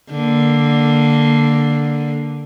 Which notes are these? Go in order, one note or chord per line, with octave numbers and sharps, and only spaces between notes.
D3 A#3